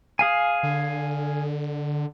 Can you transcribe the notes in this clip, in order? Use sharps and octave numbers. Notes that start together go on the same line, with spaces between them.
G#4 F5 G#5
D3